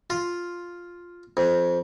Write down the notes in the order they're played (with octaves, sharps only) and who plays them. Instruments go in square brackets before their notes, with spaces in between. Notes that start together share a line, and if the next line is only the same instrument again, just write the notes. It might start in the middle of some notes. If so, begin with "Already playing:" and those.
[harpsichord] F4
F2